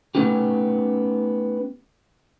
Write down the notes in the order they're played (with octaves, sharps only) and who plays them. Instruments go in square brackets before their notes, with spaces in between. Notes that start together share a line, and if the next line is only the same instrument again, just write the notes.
[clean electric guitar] A3 B3 C#4 D#4 G4